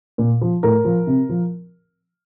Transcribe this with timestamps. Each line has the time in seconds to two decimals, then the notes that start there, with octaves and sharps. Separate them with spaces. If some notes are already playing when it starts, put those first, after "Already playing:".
0.18 A#2
0.41 F3
0.63 A2 A#4
0.85 F3
1.07 C3
1.29 F3